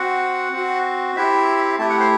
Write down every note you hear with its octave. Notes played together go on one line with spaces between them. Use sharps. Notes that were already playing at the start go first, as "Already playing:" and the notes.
Already playing: C4 F#4 F#5
C4 F#4
C4 E4 G4 E5
A3 E4 G4 A5
F#5
C5